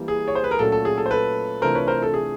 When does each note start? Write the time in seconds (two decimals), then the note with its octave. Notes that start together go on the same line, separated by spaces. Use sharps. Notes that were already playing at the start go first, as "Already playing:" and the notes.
Already playing: E3 G3 A#3
0.08 G#4
0.28 C#5
0.35 C5
0.44 B4
0.51 A#4
0.59 A#2 F#3 A3 C#4 A4
0.72 A4
0.85 G#4
0.98 A4
1.06 C5
1.11 A4 B4
1.62 C3 E3 A3 D4 F4 A#4 C5
1.75 B4 C#5
1.87 A#4 C5
2.03 A4
2.14 G#4